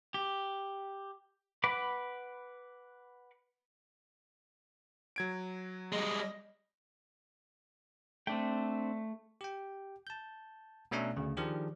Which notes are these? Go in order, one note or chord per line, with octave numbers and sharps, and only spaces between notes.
G4
B4 F#5 B5 D6
F#3 G#6 D7
G3 G#3 D#5
A3 C4 D4 G5
G4 G5
A5 G6
B2 A3 C#4 D4 E5 A#5
D2 C#3
D#3 F3 D4 G4 G#4